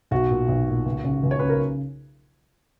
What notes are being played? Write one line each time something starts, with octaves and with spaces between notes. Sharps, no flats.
B1 F#4
A#2
B1
A#2
C#2
C#3
C#2
C#5
C#3 B4
A#4